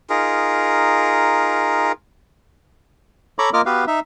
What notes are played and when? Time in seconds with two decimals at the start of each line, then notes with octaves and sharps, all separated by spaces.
0.10 D#4 F4 G#4 A#4
3.39 A4 C#5 A#5 B5 C#6 D6
3.53 A#3 F4 A#4 D#5 D6 F6
3.66 B3 F#4 G4 B4 F5
3.87 D#4 E5